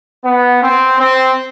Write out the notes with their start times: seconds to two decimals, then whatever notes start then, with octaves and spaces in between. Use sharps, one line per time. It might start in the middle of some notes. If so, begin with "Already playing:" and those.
0.24 B3
0.62 C4
0.98 C4